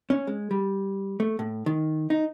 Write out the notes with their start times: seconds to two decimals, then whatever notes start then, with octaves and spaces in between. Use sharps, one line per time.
0.10 C#4
0.27 G#3
0.51 G3
1.20 A3
1.39 A2
1.66 D#3
2.10 D#4